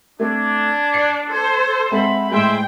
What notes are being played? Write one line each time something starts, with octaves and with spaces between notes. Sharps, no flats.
A3 C4 D4 A4 G#6
D5 C7 C#7
A4 C5 G#6
G#3 C4 E5 F#5 B5
A2 G#3 G#4 C5 E5 G5 B5 C6